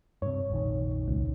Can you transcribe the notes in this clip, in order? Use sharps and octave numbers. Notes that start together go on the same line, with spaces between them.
G2 C3 C#5
F1 A#1 D#3
C#2